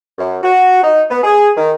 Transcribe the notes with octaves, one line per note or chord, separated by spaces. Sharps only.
F#2
F#4
D#4
B3
G#4
D#3